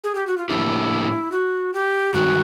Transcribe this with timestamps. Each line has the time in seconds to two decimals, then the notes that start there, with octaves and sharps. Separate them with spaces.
0.04 G#4
0.15 G4
0.27 F#4
0.38 F4
0.49 A2 F3 A#3 D4 E4 G4
1.32 F#4
1.74 G4
2.14 G2 D#3 G#3 F#4